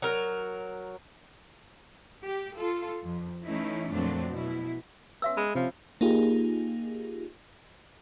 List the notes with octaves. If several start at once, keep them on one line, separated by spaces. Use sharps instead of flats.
F#3 A#4
G4
F4 A4
F2
E3 A3 C#4 D#4 E4
F2 A#2 F#3 A3 C4 D4
B2 E4
B3 C#4 F#4 E5 E6
G#3 B5
C3 F3 C#4 F5
A#3 D#4 F4 G4 G#4